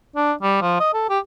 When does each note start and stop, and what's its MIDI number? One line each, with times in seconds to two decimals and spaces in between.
0.16 0.33 62
0.42 0.58 55
0.61 0.75 53
0.80 0.93 75
0.93 1.06 69
1.09 1.19 67